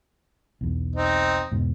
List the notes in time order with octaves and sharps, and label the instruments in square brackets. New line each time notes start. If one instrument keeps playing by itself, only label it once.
[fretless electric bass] B1 E2
[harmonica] C4 D#4
[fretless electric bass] E2 G#2 B2